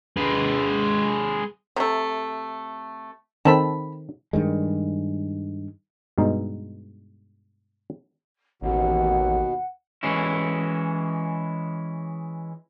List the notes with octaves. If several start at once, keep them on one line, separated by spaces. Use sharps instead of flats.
G#3 B4
C3 A3
D#3 C4 A4 A5 B5
G2 D#3 G#3
G2 B2 G#3 D#4
A1 D#2 B2 F#5
E3 G#3 C#4 E4